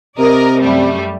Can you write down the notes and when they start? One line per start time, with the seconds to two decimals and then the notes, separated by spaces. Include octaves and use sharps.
0.18 C3 A#4 D5 D#5
0.60 F#2 G3 A3